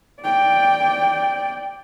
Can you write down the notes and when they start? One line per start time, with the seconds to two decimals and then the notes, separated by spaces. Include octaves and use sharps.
0.23 D5 G5